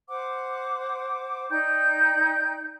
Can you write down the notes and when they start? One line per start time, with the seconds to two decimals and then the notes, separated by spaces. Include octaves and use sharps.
0.09 C5 F#5 D6
1.50 D#4 D5 G5 G6